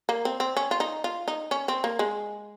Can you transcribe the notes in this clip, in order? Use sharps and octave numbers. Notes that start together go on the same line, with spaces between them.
A#3
C4
C4
C#4
F4
D#4
F4
D#4
C#4
C4
A#3
G#3